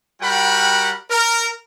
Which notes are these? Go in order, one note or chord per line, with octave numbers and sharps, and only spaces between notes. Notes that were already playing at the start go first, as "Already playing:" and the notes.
G3 F#4 A#4 F#5 G5 B5
A#4